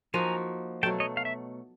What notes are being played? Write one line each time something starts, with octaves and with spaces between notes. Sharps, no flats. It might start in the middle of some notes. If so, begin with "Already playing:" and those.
F3 A#3 D#4 F#4 G#5 A#5
B2 F#3 A3 G5 A5
C#5 D#5
F5
E5